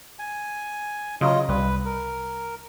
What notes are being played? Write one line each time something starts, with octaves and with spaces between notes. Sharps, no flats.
G#5
C#3 F#3 F4 D#5
C2 G3 B4
A#4